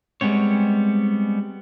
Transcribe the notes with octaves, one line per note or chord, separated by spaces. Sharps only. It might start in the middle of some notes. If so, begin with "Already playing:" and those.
G3 G#3 B3 C4 C#5